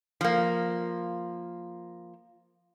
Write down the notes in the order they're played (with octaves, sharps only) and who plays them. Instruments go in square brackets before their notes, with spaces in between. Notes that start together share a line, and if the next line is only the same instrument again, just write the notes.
[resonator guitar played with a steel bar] F3 A#3